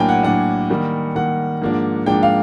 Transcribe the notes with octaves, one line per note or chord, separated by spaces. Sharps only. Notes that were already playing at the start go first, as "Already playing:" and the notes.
Already playing: A2 F#3 A#3 D4 G5 G#5
F#5
A2 F#3 A#3 D4 F#5
D#3 G3 A#3
D#3 G3 A#3 F#5
G#2 F3 A#3 D4
G#2 F3 A#3 D4 G5
F5